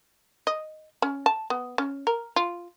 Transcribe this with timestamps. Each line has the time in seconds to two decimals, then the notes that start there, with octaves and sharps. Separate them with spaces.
0.47 D#5
1.02 C#4
1.26 A5
1.50 B3
1.78 C#4
2.07 A#4
2.36 F4